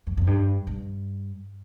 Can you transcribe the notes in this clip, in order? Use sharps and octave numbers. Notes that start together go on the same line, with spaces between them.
F2
F2
G2
G2